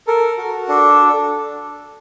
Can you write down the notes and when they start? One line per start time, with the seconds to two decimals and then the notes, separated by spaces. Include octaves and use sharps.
0.07 A4 A#4
0.38 F#4
0.68 D4 A4